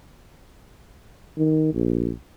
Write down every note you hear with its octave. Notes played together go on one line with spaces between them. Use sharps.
D#3
A#1